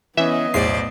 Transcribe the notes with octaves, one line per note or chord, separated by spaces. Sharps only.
E3 B3 C#4 D#5 E5
B1 E2 A2 C5 D5 C7